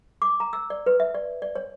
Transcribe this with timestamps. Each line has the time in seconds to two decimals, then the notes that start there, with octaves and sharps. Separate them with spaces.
0.22 D6
0.40 A#5
0.53 E6
0.70 D5
0.86 B4
1.00 E5
1.15 D5
1.42 D5
1.56 C#5